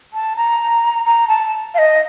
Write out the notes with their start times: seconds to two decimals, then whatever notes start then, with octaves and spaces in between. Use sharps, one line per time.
0.13 A5
0.37 A#5
1.05 A#5
1.28 A5
1.74 F5
1.78 D#5